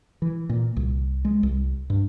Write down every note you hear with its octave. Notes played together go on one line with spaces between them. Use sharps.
E3
A#2
C2
G#3
C2
G2